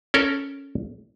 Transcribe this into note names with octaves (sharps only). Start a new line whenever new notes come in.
C#4 A4 A#4